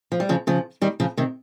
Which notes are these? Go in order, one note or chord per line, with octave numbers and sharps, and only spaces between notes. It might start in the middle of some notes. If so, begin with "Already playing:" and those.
F3
G3
C#3 F3
C#3 F3
D#3 G3
C#3 F3
C3 D#3